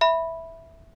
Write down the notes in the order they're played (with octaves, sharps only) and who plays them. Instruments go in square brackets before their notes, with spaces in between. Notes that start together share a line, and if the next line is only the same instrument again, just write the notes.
[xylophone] E5 B5